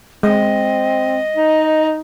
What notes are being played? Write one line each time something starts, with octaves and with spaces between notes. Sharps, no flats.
G#3 C4 D#5
D#4